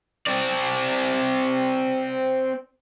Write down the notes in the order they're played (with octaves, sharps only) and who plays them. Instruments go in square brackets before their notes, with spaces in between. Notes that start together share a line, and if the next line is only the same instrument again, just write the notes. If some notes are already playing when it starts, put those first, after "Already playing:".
[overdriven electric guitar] C4 D5